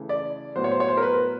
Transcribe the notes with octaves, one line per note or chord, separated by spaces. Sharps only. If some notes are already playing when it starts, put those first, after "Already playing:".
Already playing: C#3 E3 A3
D5
A2 F#3 B3 C5
C#5
C5
C#5
C5
A#4
B4